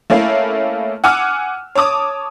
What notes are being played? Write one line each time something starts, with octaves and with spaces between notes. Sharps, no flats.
A3 A#3 C#4 E4 F5
F#5 G#5 D6 E6 F6
C#5 A5 D6 D#6